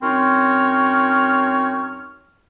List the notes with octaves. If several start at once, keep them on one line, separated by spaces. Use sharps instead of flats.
F#2 C4 D#4 C#5 C6 F6